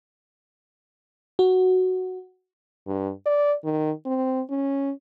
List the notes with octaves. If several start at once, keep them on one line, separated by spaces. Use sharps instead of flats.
F#4
G2
D5
D#3
C4
C#4